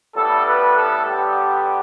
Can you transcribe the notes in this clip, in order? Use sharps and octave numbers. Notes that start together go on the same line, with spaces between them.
A2 G3 B3 A4
B4
A4
D3 G3 B3 G4